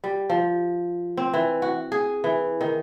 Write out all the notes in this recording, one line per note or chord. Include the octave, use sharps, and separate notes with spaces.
G3
F3
C4
E3
F#4
G#4
E3
D#3